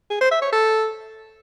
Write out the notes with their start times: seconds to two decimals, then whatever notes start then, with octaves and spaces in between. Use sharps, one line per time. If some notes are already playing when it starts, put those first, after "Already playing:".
0.10 G#4
0.21 C5
0.31 E5
0.42 C#5
0.52 A4